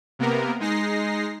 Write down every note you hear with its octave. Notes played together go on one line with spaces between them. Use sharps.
C3 A#3 B3 A#4
G#3 D#4 A#6 C7